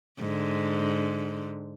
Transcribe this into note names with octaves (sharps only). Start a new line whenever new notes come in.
G#2 D3